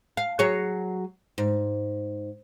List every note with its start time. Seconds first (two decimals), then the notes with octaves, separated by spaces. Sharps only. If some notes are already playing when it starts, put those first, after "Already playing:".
0.17 F5
0.39 F#3 G#4 C#5
1.38 G#2